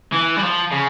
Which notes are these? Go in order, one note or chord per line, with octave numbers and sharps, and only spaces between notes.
E3
G3
F3
C#3